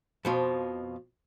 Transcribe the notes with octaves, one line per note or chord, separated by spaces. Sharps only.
F2 B2 F3